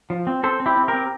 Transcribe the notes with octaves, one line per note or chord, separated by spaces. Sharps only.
F3
C4
C4 A4 C5
C4
E4 G4
C4
G4 A#4
C4